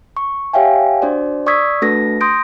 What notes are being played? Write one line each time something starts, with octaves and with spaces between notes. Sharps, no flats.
C#6
G4 C#5 E5 F5 G5 G#5
D4 F#4 C5 D5
D5 C#6 D#6 E6 G#6 B6
A3 D4 F#4 A4 B4 A#6
C6 D#6 G6 A#6 D7